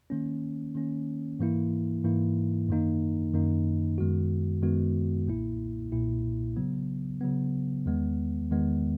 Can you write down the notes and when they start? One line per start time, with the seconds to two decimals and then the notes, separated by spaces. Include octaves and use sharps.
0.10 D#3 A#3 C#4
0.75 D#3 A#3 C#4
1.39 G#2 E3 A#3 E4
2.04 G#2 E3 A#3 E4
2.69 F#2 D#3 A#3 D#4
3.33 F#2 D#3 A#3 D#4
3.98 F#2 D#3 G#3 B3 F#4
4.62 F#2 D#3 G#3 B3 F#4
5.27 B1 A#2 A#3 E4
5.92 B1 A#2 A#3 E4
6.56 C#3 F#3 B3
7.21 C#3 F#3 B3
7.86 E2 D#3 G#3 B3
8.50 E2 D#3 G#3 B3